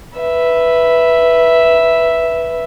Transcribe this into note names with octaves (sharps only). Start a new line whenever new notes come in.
B4 E5